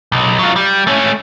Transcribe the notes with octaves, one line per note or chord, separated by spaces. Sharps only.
B1
F#3 F4
G3
A3 C#4